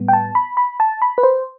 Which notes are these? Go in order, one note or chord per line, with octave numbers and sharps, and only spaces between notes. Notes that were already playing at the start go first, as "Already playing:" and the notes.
Already playing: A2 G3 B3
G5
A5
B5
B5
A5
B5
B4
C5